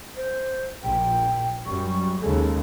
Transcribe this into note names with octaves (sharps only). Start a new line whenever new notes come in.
C5
A#1 G5
F#2 G3 C#6
D#2 C#3 G#3 A4